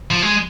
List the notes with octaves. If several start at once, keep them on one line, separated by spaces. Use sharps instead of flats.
F3
G#3